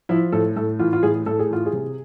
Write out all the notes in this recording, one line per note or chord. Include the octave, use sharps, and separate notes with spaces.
F3 E4
A2 A4
A2 A4
E3 F4
F4
A2 G#4
A2 A4
G#4
E3 F4
G#4
C3